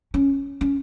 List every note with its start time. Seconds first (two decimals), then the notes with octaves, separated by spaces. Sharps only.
0.14 C#4
0.61 C#4